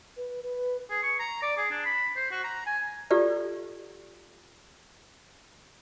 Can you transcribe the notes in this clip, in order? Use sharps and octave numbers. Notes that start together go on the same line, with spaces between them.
B4
B4
G#4
C#6
A#5
D5
G#4
D4
B5
C5
F#4
A#5
G#5
F4 G4 A4 D5